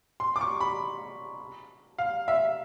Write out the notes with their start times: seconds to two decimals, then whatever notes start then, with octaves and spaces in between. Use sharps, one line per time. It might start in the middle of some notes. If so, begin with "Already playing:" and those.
0.20 C6
0.36 D6
0.41 C#6
0.61 B5
1.99 F5
2.28 E5